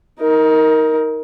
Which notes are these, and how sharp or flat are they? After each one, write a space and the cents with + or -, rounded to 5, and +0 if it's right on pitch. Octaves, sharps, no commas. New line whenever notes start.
D#4 +25 A#4 +0